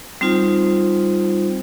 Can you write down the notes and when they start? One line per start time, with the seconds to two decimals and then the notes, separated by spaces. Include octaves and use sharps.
0.21 G3 C4 D#4 F4 C5